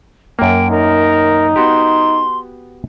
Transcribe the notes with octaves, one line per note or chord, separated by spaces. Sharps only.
F#2 A#3 G5
D#4 A#4
B3 F#4 G4 C6